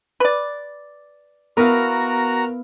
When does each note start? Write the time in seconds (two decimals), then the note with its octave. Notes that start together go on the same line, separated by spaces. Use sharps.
0.20 B4 D5
1.57 B3 E4 F#4 A#4 F5 A#5